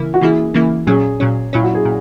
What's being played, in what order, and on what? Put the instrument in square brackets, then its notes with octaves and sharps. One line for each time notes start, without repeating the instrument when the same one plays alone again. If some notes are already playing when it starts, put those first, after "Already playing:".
Already playing: [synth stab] C#3 E3 A#3 E4
[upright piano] F#4
[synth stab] C#3 E3 A#3 E4 [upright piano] G#4
[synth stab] C#3 E3 A#3 E4
[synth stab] A#2 F#3 C#4 [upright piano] G#4
[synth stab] A#2 F#3 C#4
[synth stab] A#2 F#3 C#4 [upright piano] E4
[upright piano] F#4
G#4
[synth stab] A#2